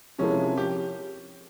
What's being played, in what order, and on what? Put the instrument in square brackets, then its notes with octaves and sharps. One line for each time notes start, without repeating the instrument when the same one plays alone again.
[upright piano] C3 F3 G#3 E4 A#4 [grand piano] C#4
[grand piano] G4